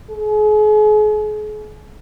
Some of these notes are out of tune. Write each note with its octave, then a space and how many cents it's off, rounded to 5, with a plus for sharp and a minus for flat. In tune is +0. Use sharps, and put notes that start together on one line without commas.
G#4 +40